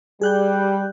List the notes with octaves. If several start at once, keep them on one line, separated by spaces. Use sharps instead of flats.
G3 G#4 F#6 G6